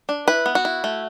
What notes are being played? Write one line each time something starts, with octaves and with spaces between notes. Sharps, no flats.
D4
E4 B4
B3
F#4
E4
A3